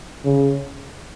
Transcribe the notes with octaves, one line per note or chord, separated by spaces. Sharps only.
C#3